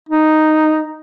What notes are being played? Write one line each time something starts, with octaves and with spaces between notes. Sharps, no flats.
D#4